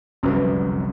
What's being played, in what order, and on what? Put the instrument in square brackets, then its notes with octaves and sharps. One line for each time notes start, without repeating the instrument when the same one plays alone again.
[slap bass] F1 C2 D3 [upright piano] F#2 B4